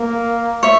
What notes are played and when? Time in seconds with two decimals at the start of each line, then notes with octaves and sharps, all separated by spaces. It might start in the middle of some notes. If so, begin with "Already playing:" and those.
Already playing: A#3
0.63 C#5 E5